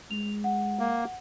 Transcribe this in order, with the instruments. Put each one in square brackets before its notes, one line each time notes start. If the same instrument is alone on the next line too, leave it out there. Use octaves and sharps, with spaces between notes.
[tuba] G#3 [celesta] F7
[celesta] F#5
[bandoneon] A#3